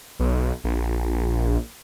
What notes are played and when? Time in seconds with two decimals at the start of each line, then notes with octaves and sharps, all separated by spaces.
0.19 B1
0.64 A#1